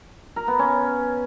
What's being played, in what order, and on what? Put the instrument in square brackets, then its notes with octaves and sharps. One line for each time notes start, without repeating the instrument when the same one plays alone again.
[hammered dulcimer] A#4
B3
C#4